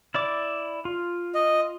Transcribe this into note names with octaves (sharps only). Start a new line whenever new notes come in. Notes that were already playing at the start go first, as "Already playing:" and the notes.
E4 D5 D6
F4
D#5